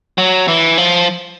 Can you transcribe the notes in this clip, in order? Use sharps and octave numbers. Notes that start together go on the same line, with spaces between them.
F#3
E3
F3